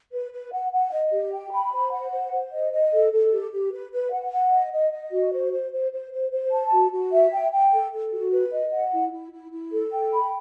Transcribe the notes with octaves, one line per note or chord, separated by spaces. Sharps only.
B4
B4
F#5
F#5
D#5
G4
G5
B5
C5
F#5
C5
C5
D#5
D#5
A4
A4
G4
G4
B4
B4
F#5
F#5
D#5
D#5
D#5
F#4
C5
C5
C5
C5
C5
C5
A5
F#4
F#4
E5
G5
G5
A4
A4
F#4
B4
D#5
F#5
E4
E4
E4
E4
A4
G5
B5